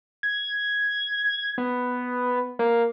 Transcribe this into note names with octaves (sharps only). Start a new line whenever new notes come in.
G#6
B3
A#3